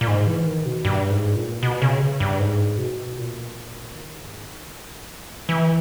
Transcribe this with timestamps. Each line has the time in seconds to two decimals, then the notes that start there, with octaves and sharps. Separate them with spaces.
0.01 A#2
0.07 G#2
0.27 E3
0.46 D#3
0.66 B2
0.85 G2
1.10 G#2
1.36 A#2
1.63 B2
1.82 C#3
2.20 G2
2.40 G#2
2.78 B2
3.17 A#2
3.95 D#3
4.20 G#2
4.46 D#3
5.49 E3